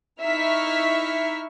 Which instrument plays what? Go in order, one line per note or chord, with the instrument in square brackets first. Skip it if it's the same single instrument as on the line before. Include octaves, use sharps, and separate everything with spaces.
[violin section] D#4 E4 E5 C#6 F6 B6